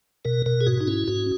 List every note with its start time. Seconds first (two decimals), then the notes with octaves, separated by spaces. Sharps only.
0.25 B2 A#4
0.46 B2 A#4
0.61 G#4
0.67 G#2 F#4
0.81 D#4
0.87 C#4 E4
1.08 G#2 F#4